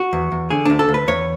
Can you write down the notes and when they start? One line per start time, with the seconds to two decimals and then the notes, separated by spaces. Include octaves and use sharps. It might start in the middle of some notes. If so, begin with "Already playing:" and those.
Already playing: F#4
0.13 E2
0.32 E2
0.50 D3 G#4
0.65 D2 D4
0.79 A4
0.89 D2
0.94 B4
1.08 E2 C#5